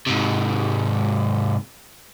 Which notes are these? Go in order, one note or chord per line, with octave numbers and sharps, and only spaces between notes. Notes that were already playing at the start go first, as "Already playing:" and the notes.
G#2 C3